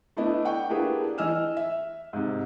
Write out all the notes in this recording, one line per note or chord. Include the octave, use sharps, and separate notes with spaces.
A3 B3 D4 E4 D#5
F#5 G5 C#6
A#3 D4 E4 G4 G#4 B4
E3 D#5 G#5 E6 F6 E7
E5
G#2 C3